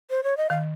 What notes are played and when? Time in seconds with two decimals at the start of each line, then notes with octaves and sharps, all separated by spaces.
0.10 C5
0.24 C#5
0.37 D#5
0.50 D#3 F5